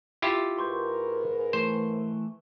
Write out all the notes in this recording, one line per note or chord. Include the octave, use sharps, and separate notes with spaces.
E4 F4 G4
G#2 A#4 B4 C6 C#6 G6
E3 A3 C5